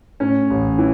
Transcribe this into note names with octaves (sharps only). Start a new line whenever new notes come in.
A2 C#4
A1
E3